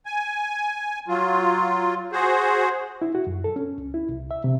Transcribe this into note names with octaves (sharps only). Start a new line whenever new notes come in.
G#5
F#3 F4
F#4 G#4 C5
E4
F#4
F#2
A4
C#4
C#2
E4
C2
E5
C3